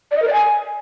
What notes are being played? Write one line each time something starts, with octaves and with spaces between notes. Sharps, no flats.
D5
D#5
A#4
D5
G#5